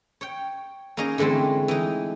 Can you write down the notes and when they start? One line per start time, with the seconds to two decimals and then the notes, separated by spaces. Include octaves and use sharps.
0.21 C#5 G5
0.97 A#3 C#4 D#4 G#4 D#5
1.18 D3 E3 G#3 A3 C4
1.68 E3 D#4